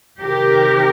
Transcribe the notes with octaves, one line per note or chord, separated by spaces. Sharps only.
C3 D#3 G4 A#4